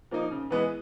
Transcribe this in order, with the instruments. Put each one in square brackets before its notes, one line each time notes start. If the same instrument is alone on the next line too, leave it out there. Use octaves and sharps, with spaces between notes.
[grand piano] F3 A#3 D#4
C#3
E3 G#3 B3